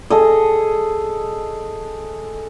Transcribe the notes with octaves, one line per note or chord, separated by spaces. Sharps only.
G#4 A4 D#5